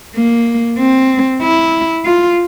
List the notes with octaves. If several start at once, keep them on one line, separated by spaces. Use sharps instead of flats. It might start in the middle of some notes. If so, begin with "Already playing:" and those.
A#3
C4
E4
F4